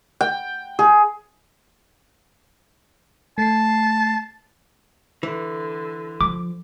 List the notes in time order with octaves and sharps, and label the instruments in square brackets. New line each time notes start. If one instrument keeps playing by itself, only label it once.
[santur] G5
G#4
[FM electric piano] A3 C7 [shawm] A5
[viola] D3 [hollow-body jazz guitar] E3
[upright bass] F3 [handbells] D6